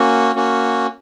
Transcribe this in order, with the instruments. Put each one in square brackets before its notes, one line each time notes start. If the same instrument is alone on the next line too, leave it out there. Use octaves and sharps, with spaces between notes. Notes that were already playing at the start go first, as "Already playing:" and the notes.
Already playing: [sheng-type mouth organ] A#3 C#4 F#4
A#3 C#4 F#4